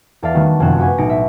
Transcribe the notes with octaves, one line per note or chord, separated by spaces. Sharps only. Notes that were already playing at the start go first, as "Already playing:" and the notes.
E2 A4 D5 E5 F5 A6
D#3 G3 A3 B3 F#4 A4
F1 A#1 F#2 F#6 E7
F#4 G4 B4 G#5
B1 A2 D#4 A#6 C#7 D7
E5